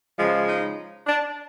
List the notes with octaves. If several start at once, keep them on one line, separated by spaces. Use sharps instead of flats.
C#3 F3 G#3
D#4
D4